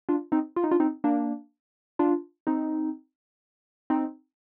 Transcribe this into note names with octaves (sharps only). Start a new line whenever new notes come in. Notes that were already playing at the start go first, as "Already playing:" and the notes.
D4 F4
C4 D#4
F4
D#4
D4 F4
C4 D#4
A#3 D4
D4 F4
C4 D#4
C4 D#4